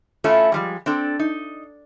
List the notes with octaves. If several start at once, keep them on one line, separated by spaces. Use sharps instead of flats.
A3 C#4 E4 F4 A4
F3 G3 G#3
C4 D4 A4
D#4